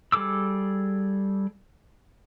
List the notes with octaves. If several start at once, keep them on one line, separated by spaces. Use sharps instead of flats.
G3 G#4 A4 D6 E6